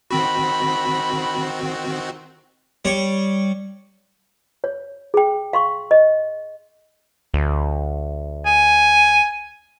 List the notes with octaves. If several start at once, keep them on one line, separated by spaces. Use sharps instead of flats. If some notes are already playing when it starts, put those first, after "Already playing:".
D#3 C4 F#4 B5
G3 C#5
C#5
G#4 G5
F5 C6 C#6
D#5
D2
G#5